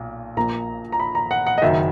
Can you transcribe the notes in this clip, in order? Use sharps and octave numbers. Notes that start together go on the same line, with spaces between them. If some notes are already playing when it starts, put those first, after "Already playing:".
Already playing: B1 A#2
A#1 A#2 A#3 A#5
A#5
B5
A#5
F#5
F#5
D#5
F#1 F#2 D#3 E5